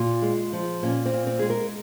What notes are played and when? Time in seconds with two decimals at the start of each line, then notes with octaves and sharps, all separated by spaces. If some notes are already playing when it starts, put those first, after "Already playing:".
Already playing: A#2 F4
0.22 G#3
0.53 F3
0.83 A#2 C#4
1.05 C4
1.13 A#2
1.27 C4
1.39 G#3 G#4
1.50 A#4